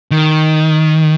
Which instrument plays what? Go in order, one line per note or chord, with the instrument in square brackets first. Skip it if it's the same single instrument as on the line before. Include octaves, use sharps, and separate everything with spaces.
[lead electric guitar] D#3